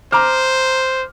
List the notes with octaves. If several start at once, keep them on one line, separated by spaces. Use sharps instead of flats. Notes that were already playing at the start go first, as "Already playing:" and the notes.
C5 A#5 D6 F6